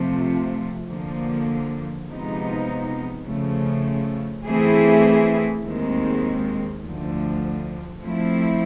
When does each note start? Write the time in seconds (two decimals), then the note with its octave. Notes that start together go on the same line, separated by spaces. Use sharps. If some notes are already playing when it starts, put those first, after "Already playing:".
Already playing: C3 F3 A3
0.89 D3 F3 A#3
2.08 C3 F3 G#3 B3 D#4
3.27 C#3 F3 A3
4.46 E3 A3 C4 E4 G#4
5.64 D#2 D#3 G#3 C4
6.83 D2 D3 F3
8.02 F3 A3 C4 E4